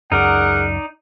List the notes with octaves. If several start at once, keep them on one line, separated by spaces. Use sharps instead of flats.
C#2 F#2 D#4 G#4 A#4 D5 F#5